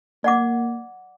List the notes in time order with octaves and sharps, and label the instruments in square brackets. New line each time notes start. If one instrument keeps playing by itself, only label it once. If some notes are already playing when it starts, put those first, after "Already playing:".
[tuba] A#3 [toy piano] D5 F#5 D6